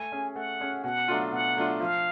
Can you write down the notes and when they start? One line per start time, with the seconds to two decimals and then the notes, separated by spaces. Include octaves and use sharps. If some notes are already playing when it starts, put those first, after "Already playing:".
Already playing: A3 G#5
0.12 C#4 G#4
0.36 A3 F#5
0.60 C#4 G#4
0.84 B2 F#5
1.08 F#3 A3 D4 F4
1.32 B2 F#5
1.56 F#3 A3 D4 F4
1.80 F3 F5